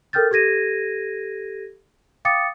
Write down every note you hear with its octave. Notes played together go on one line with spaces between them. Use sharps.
A4 A#4 G5 F6 G6 A6
G4 A4 G#6 A#6 D#7
F5 G5 D6 D#6 A6 C#7